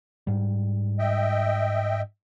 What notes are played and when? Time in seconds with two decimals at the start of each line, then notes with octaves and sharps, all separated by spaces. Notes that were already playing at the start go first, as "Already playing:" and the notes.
0.27 G#2 G3
0.99 D#5 E5 G5